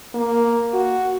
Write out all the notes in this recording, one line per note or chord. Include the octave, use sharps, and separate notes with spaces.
A#3
F#4